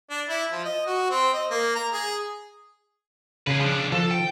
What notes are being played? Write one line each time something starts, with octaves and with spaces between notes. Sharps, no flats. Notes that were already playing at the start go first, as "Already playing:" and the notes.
D4
E4
F3
D#5
F#4
C4
D#5
A#3
A#5
G#4
C#3 G#4 B4
F3 D4
F3 A4
G5